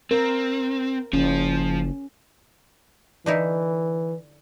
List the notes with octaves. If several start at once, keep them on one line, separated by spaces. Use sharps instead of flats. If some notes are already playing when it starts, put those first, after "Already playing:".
C4 A#4
F#1 F3 C#4
D3 E3 D#4 E4